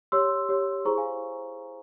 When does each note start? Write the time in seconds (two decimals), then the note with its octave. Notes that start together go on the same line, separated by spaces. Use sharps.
0.12 G4 C#5 C6 E6
0.49 G4 C#5
0.85 E4 G#4 C5 A#5 C#6
0.98 F5 G#5